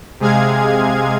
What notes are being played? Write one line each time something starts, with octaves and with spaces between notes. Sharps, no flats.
C3 G#3 G#4 F5 G#6